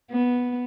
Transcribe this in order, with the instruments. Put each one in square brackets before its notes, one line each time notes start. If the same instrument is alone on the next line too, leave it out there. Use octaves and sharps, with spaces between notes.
[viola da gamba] B3